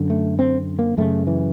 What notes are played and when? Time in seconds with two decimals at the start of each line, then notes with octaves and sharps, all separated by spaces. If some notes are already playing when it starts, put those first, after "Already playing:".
Already playing: F#2 D3
0.10 A3
0.39 C4
0.79 A#3
0.98 F#2 C#3 A3
1.27 E3